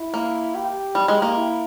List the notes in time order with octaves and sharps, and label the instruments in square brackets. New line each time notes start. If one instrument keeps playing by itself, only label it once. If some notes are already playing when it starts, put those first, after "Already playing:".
Already playing: [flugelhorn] E4
[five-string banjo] A#3
[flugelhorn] G4
[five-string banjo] G3
G#3
A#3
[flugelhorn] E4